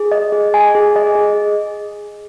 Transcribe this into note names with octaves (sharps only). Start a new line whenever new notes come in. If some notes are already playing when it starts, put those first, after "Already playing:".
Already playing: G#4
D#5
G#4
G#5
G#4
D#5
G#4